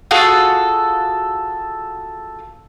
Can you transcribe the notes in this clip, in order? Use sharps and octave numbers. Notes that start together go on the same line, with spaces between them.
F4 F#4 G#4 A4